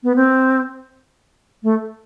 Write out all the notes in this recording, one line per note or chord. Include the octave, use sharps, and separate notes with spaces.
B3
C4
A3